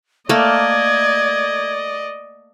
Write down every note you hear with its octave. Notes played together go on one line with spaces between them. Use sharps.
A3 A#3 D5 D#5 G#6